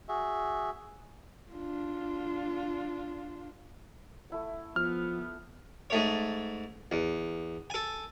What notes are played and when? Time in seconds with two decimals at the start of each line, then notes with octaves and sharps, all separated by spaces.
0.08 F#4 G#4 E5
1.52 D4 F4
4.30 A3 E4 F#5
4.76 F3 B3 F6
5.90 G#2 A3 C#5
6.92 E2
7.70 A4 G#5